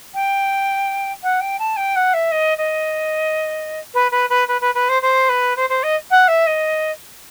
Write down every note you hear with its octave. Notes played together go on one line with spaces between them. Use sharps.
G5
F#5
G5
A5
G5
F#5
E5
D#5
D#5
B4
B4
B4
B4
B4
B4
C5
C5
B4
C5
C5
D#5
F#5
E5
D#5